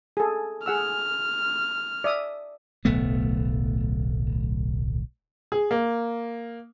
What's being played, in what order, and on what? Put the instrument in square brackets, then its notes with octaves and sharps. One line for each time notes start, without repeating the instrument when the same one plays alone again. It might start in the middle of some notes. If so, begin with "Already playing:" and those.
[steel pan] G#4 A4
[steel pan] G#4 F#5 E6 [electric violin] F6
[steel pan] D5 E5 D#6
[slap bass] D1 B1 A3 B3
[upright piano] G#4
A#3